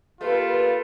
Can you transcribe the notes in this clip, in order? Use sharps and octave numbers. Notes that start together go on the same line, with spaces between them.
A3 A#3 F4 G4 B4